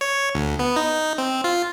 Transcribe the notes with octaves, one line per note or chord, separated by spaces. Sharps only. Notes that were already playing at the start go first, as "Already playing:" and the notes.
C#5
D2
B3
D#4
C4
F4